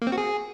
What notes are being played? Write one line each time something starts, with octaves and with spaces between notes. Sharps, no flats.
A#3
C4
F#4
G#4